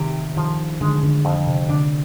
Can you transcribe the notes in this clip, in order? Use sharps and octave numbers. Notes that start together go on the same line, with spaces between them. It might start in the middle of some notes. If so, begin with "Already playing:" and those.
Already playing: C3 D#3 G4
D#3 F3
D3 G#3
D3
F2
C3
D3 D4